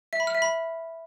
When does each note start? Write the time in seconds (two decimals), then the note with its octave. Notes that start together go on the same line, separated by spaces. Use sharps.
0.13 E5
0.20 B5
0.27 F6
0.35 E5
0.42 B5